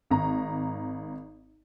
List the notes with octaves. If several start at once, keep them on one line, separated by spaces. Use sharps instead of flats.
G#1 A#5